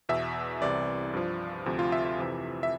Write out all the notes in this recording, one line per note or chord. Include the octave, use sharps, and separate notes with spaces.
E2 B2 E5
C2 C3 E3 D5
G2 F3
D2 C3 F3
F4
E5
E5
F2 C3 E3
E5